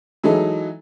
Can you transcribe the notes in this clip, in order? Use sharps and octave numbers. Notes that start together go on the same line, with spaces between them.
E3 F#3 G#3 D#4 A4